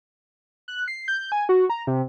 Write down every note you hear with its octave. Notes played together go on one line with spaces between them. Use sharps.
F#6
C7
G6
G#5
F#4
A#5
C3